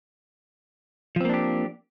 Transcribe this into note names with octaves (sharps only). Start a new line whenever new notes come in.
F3 A#3 C4 D4 G4